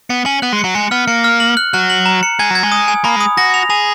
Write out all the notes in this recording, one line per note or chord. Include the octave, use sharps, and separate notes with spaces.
B3 C#7
C#4 F#7
B3 F#6
G#3
C#7
F#3
G#3 C#7
B3 F6
A#3 C#7
F6
F#7
F#6
F#3 F#6
F#7
A#5
C#7
G#3 G#6
F#3 G#6
G#3
D#6
G#5
A#3 B5
G#3
D#6
F#4 A#6
F7
G#4 F7